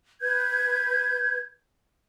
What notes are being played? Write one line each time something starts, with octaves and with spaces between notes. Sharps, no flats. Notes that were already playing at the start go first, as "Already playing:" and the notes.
B4 G6 G#6